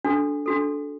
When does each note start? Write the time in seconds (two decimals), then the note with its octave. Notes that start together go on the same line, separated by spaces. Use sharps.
0.04 D4 F#4 A4
0.46 D4 F#4 A4